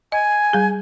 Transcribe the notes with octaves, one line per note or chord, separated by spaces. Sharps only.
D#5 G#5
G3 G#4